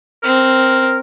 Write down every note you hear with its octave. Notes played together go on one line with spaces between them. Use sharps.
C4 A#4